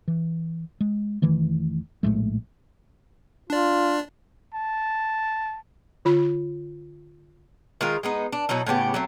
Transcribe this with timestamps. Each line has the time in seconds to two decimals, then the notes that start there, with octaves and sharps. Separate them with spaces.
0.08 E3
0.80 G#3
1.22 F1 D#3 E3 A3
2.03 A#1 A2 G#3 A3
3.50 D4 F4 D5
4.54 A5
6.05 D3 F4 B5
7.81 D#3 G#3 F4 A#4
8.03 G#3 B3 D#4
8.32 D4
8.49 B2 F#3 D#4 E4
8.66 A2 C#3 B3 G4
8.94 F#3 A3 C4